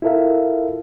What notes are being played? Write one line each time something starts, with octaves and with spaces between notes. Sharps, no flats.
E4 F4 A4 A#4 E5 F5